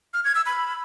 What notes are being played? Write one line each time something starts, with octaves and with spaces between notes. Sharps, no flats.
F6
G#6
E6
B5